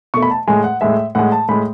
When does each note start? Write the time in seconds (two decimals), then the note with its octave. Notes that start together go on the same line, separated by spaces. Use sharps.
0.14 B2 A3 C#6
0.22 B5
0.31 A5
0.48 A2 G#3 G#5
0.64 F#5
0.81 A2 G#3 E5
1.15 A2 G#3 F#5
1.32 A5
1.49 A2 G#3 B5